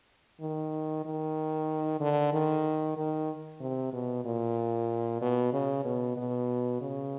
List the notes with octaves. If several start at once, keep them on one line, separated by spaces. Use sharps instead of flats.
D#3
D#3
D3
D#3
D#3
C3
B2
A#2
B2
C#3
B2
B2
C#3